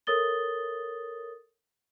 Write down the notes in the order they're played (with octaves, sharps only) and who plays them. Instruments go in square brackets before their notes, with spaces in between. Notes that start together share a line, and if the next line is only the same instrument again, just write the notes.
[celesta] A4 A#4 C#5 D#6 A6 G7